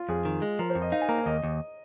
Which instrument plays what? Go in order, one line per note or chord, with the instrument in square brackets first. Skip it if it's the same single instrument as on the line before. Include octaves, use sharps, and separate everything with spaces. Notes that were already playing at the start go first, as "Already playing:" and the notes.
Already playing: [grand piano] F4
[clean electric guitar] F2 [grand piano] G#4
[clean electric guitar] D#3
G#3
[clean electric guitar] F3 [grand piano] A#4
[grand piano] C5
[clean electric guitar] F2
[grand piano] D#5
[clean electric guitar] D#4 [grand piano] F5
[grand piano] G#5
[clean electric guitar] A#3 [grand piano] A#5
[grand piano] G#5
[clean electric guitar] D#2 [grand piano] D#5
[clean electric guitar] D#2